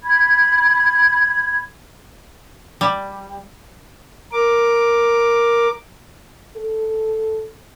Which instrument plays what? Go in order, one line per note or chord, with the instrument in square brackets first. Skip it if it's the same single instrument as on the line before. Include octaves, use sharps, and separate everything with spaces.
[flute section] B5 G#6
[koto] G3
[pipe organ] A#4 D6
[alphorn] A4